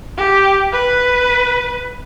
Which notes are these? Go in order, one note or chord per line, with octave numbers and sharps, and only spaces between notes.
G4
B4